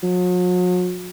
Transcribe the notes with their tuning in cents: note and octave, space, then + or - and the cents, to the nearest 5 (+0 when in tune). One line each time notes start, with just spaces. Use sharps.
F#3 -45